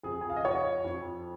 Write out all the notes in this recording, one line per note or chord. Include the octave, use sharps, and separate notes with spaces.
F2 G#4
G#5
F5
D#5
F2 C#5
F2